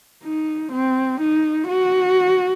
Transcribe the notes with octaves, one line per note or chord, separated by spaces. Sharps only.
D#4
C4
D#4
F#4